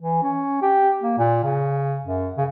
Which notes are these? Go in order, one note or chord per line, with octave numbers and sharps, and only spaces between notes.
E3
C#4
G4
A#3
A#2
C#3
F#2
C#3